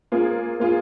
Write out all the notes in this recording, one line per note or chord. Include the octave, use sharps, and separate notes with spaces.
A#3 F4 G#4
A#3 F4 G#4